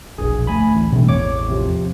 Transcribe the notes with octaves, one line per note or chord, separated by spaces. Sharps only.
E1 A#1 G#4
D2 A3 G#5 B5
A1
G2 B2 E3 A3 C4
A1 E2 C#5 D6
C3 F3